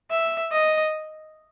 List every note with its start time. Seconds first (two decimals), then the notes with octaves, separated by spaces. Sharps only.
0.11 E5
0.52 D#5